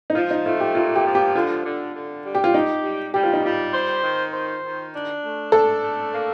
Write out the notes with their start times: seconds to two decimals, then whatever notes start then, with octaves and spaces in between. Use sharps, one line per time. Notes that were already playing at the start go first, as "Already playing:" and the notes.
0.10 D#4
0.15 F3 F4
0.31 D#4
0.45 A3 F4
0.60 G4
0.75 A#2 F4
0.95 G4
1.05 F3
1.15 G4
1.35 D3 F4
1.65 D3
1.95 D3
2.24 G3
2.35 G4
2.44 F4
2.54 D#4 G4
2.84 G3
3.14 G3 G4
3.23 F4
3.33 D#4
3.43 G3 F4
3.74 C5
4.04 D#3
4.33 C5
4.63 D#3
4.93 D4
5.23 A3
5.52 D4 A4
5.82 A3
6.13 A#3